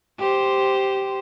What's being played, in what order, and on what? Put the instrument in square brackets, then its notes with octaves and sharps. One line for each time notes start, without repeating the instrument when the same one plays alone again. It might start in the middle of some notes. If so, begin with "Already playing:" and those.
[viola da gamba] G4 C5